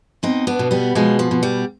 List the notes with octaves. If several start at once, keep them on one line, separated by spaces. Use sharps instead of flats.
B2 C4 D#4
B3 D4
B2
G3 B3
B2 F3 G#3
F3
B2
G3